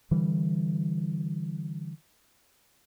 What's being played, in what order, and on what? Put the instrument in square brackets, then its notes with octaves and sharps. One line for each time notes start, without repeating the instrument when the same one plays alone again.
[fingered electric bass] D3 E3 G3